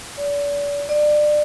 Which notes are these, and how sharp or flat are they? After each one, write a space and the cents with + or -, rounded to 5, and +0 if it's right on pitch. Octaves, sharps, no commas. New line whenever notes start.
D5 -40
D5 +25